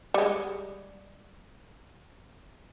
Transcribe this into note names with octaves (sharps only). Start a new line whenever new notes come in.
G3 G#3